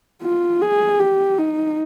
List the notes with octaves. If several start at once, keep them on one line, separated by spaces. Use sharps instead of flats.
F4
G#4
G4
D#4